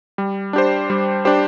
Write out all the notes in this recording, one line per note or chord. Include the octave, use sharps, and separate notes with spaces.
G3
D4 G4 C5
G3
D4 G4 C5